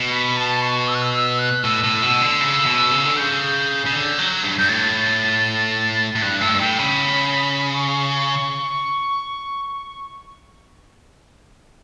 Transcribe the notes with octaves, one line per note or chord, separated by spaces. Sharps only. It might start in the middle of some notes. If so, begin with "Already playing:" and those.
Already playing: B2
B5
A5
C#6
E6
F#6
E6
E6
F#6
A2 E6
A2
B2
D3
C#3
B2
C#3
D3
C#3 G6
C#3
D3
F#3
G2
G2 G6
A2 A6
A2
G2 F#6
A2 E6
G2
A2 G5
C#3 B5
C#6